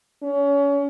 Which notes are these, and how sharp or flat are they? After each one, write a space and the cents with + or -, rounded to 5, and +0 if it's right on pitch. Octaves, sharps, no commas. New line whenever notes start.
C#4 +30